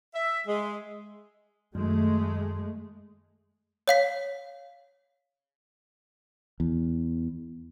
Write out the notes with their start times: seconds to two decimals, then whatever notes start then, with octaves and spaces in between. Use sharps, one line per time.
0.15 E5
0.47 G#3
1.75 F#2 D#3 G#3 A3
3.88 C#5 F5 B6
6.60 E2